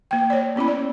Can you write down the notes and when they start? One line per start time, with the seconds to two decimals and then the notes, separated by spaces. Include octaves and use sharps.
0.11 A#3 G5
0.30 C#5 D5
0.56 B3 C#4 E4 B5
0.68 D5